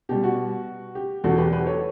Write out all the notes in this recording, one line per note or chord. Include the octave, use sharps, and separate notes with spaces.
B2 G3 G4
F#4
G4
E2 B2 F#3 F#4 A4
G4 B4
G4 B4
A4 C#5